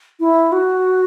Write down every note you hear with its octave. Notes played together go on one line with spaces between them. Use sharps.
E4
F#4